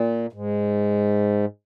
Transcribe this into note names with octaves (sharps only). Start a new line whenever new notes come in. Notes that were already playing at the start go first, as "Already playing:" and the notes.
Already playing: A#2
G#2